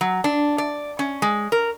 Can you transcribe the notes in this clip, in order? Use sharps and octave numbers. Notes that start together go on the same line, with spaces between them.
F#3
D4
D5
C#4
G#3
A#4